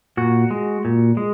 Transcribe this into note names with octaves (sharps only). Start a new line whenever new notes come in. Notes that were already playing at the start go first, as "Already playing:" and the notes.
A#2 F#4
G#3
A#2
G#3